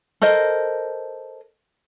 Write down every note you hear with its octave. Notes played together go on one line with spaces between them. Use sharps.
A4 A#4 C5 D#5